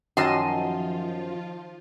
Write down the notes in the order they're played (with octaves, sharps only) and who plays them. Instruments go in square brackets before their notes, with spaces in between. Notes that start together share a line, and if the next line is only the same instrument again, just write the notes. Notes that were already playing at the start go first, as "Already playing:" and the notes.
[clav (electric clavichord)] F#2 [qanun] D#3 F#3 [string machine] F3 F4 [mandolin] D#5 A5 C6